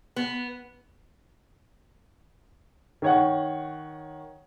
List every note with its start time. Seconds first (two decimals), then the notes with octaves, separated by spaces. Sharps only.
0.16 B3
3.02 D#3 C#5 F#5